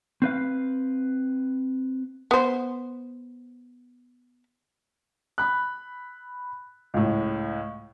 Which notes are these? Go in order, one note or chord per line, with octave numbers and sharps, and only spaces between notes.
C4 B4 F5
B3 C5
B5 F#6
C#2 A2